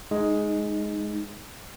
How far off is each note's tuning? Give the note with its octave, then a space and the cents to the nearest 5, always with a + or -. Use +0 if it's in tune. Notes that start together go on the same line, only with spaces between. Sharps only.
G#3 +5 D#4 -5